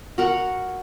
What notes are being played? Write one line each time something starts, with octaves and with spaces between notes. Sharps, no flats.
F#4 A#4 F#5